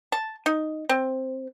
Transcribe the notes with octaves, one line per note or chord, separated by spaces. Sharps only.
A5
D#4
C4